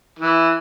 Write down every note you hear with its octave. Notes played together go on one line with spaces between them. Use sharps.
E3